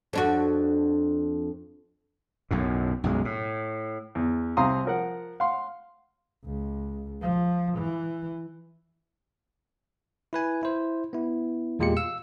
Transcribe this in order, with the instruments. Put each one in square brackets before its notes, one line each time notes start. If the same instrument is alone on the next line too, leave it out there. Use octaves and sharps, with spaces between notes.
[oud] F2 D4 F#4
[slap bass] B1 F#2 A2
B1 F#2 G#3
A2
[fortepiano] E2
C2 C3 F5 A#5 C6 D#6
F3 A#4 F#5
F5 F#5 C6
[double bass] C#2
F3
E3
[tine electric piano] E4 B4 G#5
E4 C5
B3 E4
E2 A#2 G#3 F4 G4 C#7
F5 E6